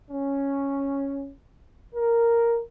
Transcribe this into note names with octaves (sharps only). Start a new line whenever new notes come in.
C#4
A#4